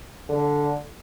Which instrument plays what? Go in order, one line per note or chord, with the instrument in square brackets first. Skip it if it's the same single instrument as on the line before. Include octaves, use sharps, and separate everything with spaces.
[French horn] D3